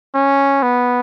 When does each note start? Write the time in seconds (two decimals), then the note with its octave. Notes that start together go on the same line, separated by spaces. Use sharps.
0.15 C#4
0.62 B3